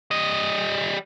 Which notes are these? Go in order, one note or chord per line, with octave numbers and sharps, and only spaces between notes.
G3 D#5